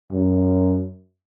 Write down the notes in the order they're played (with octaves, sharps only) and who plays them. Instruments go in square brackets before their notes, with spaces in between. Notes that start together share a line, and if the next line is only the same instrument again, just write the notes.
[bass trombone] F#2